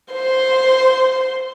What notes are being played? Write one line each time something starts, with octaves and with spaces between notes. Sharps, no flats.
C5 C6